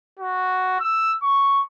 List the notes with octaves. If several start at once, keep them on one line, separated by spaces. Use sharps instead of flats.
F#4
E6
C#6